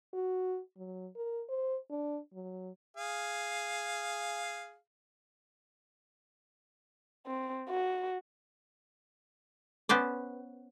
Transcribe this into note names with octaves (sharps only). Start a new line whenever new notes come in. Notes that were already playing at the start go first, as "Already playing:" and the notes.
F#4
F#3
A#4
C5
D4
F#3
G#4 F5
C4
F#4
B3 C#4 C5 D5